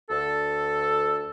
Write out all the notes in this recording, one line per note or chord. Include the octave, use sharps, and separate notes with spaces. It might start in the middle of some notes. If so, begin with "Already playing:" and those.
D2 A4